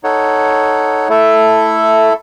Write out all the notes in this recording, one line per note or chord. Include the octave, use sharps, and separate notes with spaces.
D#4 A4 C#5 F#5
A3 E4 A4 E5